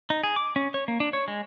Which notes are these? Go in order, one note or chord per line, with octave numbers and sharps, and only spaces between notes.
D#4
G#4
D6
C#4
C#5
A#3
D4
C#5
G#3